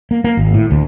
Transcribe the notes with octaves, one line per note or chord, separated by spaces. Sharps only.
A#3
A#3
G#1
A2
D2